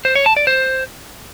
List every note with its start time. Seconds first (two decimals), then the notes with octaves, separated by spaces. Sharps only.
0.05 C5
0.15 C#5
0.26 A5
0.37 D5
0.47 C5